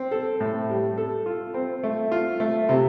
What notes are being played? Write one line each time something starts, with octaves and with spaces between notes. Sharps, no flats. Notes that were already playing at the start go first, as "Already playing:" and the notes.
Already playing: C4
A4
A2
G3
A4
F4
C4
A3
F4
A3
C3